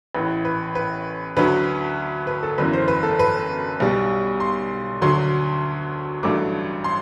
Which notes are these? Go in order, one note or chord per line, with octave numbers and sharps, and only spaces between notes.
A1 A2 E3 B4
B4
B4
D2 D3 F#3 B4
B4
A4
G1 F#2 E3 B4
C5
B4
A4
B4
B1 B2 G3
C6
D2 D3 F#3 C6
A1 G2 F#3 A3 D6
C6